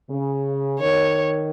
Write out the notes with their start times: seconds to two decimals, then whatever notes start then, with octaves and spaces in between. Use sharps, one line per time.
0.10 C#3
0.80 D#3 C#5